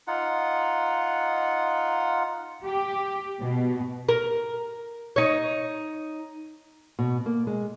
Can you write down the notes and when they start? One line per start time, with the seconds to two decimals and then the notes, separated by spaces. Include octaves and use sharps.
0.07 D#4 F4 F#5
2.64 G4
3.40 B2
4.09 A#4
5.16 D#4 C#5
6.99 B2
7.26 A#3
7.47 G#3